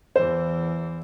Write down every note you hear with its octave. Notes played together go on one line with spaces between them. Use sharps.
E2 E3 C5